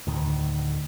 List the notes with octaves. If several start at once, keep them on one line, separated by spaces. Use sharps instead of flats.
D2 A2 D#3